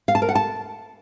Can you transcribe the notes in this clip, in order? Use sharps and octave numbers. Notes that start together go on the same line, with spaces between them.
F5
A5
A#4
F#5
A5